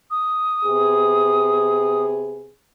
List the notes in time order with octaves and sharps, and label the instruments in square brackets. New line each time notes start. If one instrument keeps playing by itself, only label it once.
[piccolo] D#6
[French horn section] C3 B3 G#4